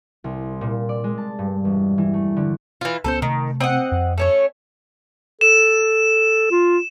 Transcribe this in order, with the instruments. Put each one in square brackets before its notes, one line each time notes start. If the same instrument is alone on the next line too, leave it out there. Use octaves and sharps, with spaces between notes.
[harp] C2
A#2
D5
G#3
A5
G2
E1
E3
A3
D3
[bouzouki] E3 F4
[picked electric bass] C#2 B3 C#4 [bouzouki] A4 B4 C5
[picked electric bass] C3 A3 [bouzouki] D#3
[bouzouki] C4 D#5 F#5
[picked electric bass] F2
[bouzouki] A3 C#4 C#5
[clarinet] A4 [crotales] E7
[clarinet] F4